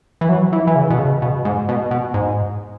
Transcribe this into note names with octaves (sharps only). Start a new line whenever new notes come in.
E3
F#3
E3
E3
C#3
B2
C#3
B2
G#2
B2
B2
G#2